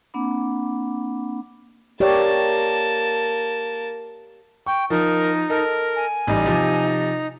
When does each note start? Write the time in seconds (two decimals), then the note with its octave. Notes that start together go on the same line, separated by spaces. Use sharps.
0.14 A#3 C4 D4 F#5 B5 D6
2.00 A#3 G4 C#5 D5 A5
4.67 G5 C#6
4.90 F3 D#4 A#4
5.50 A4 A#4 D#5
5.96 G#5
6.27 A1 G3 D#4
6.46 C3 F3